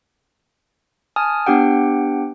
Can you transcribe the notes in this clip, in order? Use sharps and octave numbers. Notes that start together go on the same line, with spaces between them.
G#5 A5 D#6 F6
B3 D4 G4 F#5 G5